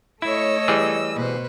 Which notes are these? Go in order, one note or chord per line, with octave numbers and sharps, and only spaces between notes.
A3 E4 A4 C#5 D#5 E6
E3 G3 G#4
B2 B4 C5